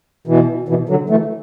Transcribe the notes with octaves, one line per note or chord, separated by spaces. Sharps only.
B2 E3
B2 E3
D3 F#3
E3 A3